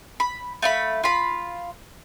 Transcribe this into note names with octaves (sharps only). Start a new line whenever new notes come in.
B5
A3 F5 B5
F4 B5